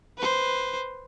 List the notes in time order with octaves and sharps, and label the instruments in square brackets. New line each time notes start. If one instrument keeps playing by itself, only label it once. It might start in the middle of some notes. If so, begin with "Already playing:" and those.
[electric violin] B4 C5